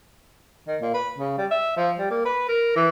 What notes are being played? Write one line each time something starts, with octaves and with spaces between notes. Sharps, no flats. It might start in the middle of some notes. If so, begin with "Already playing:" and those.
D#3
A#2
B4
C#3
G3
E5
F3
G3
A#3
B4
A#4
E3